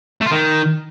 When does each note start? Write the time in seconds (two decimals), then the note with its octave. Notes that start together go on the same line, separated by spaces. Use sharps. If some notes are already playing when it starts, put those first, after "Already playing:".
0.21 A3
0.27 F4
0.32 D#3